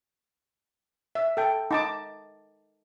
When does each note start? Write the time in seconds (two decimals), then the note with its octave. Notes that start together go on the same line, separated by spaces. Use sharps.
1.15 E5
1.37 A4 G5
1.71 D#4 A5 D6